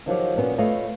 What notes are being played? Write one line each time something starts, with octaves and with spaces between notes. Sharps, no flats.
D#3 F3 F#3 G4
A#2 B3 C#4 F#4
A3 F4 B4 C#5 D#5